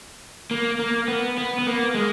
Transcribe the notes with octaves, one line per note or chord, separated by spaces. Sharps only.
A#3
A#3
B3
B3
B3
A#3
G#3